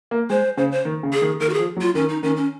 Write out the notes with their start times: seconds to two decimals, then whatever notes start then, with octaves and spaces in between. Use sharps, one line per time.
0.11 A#3
0.30 G#3 C5
0.57 C#3 C5
0.72 C5
0.85 D#3
1.03 C#3
1.13 G#4
1.22 D#3
1.40 D#3 A#4
1.49 F#4
1.54 G#4
1.59 F3
1.76 F#3
1.81 F4
1.95 D#3 C#4
2.09 D#4
2.23 D#3 C#4
2.36 C#4